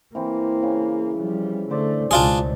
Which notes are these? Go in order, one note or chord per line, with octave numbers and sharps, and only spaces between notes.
E3 A#3 C4
C#3
F3 G3
D3 A3 C5 D5
C#2 B2 D4 D#4 F4 G#4 A5